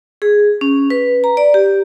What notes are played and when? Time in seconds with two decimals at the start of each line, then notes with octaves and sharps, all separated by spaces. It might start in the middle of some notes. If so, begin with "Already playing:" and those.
0.22 G#4
0.61 C#4
0.90 B4
1.24 A#5
1.37 D5
1.54 G4